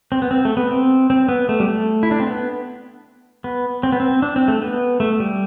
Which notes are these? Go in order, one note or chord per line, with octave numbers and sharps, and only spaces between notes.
C4
B3
C4
A3
B3
C4
C4
B3
A3
G3
A3
E4
D4
C4
B3
B3
C4
B3
C4
D4
C4
A3
B3
A3
G3